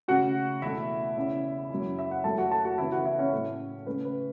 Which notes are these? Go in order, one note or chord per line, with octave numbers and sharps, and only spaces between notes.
C#3 A3 C#4 F#4 F#5
E2 B2 A3 E4 E5
E2 C#3 E3 C#4
F#2 F#3 C#4
E5
F#5
F#2 F#3 A3 A4 A5
F#4 F#5
A4 A5
F#4 F#5
C#3 E3 B3 E4 E5
F#4 F#5
E4 E5
C#4 C#5
A2 A3 C#4
C#3 A3 C#4 B4
B4